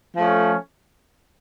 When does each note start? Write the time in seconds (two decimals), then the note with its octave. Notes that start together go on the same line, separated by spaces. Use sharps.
0.17 F3 A3 C#4